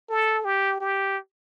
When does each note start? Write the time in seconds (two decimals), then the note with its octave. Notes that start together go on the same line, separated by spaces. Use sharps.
0.10 A4
0.45 G4
0.80 G4